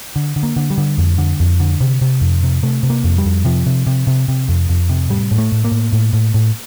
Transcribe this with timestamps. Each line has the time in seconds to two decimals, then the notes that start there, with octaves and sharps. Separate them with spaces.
0.16 D3
0.36 D3
0.43 A#3
0.56 D3
0.70 G3
0.78 D3
0.98 F2
1.18 D3
1.40 F2
1.60 D3
1.81 C3
2.01 C3
2.21 F2
2.43 C3
2.63 C3 A3
2.83 C3
2.90 A#3
3.04 F2
3.18 G3
3.25 F2
3.45 C3 F3
3.66 C3
3.87 C3
4.07 C3
4.28 C3
4.49 F2
4.69 F2
4.89 C3
5.09 A2 G3
5.31 A2
5.38 A3
5.52 A2
5.64 A#3
5.71 A2
5.93 A2
6.13 A2
6.34 A2